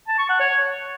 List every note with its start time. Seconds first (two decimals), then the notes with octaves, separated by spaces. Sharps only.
0.08 A5
0.19 C#6
0.29 F#5
0.40 C#5